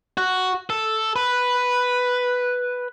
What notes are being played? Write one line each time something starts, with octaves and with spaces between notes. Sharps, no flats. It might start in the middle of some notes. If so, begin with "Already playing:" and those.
F#4
A4
B4